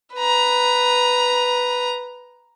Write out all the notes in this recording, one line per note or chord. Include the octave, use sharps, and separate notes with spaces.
B4 A#5